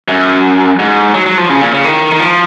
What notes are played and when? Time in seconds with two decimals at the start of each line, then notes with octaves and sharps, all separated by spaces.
0.08 F#2
0.79 G#2
1.14 F#3
1.26 F#3
1.38 F3
1.49 C#3
1.61 A#2
1.72 C#3
1.85 D#3
2.12 D#3
2.20 F3